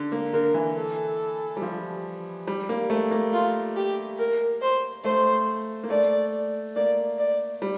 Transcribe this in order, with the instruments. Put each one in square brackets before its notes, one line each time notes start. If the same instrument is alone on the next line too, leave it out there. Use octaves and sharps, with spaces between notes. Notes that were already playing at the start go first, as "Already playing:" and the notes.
Already playing: [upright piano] D3
A#3
[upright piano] D3 [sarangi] A#4
[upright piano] E3
[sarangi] A4
[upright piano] G3
F3
G3
A#3
A3
A#3
[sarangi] F4
G4
A#4
C5
[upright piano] A3 [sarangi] C5
[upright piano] A#3
[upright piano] A3 [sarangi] D5
[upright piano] A#3 [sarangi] D5
[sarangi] D5
[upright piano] G3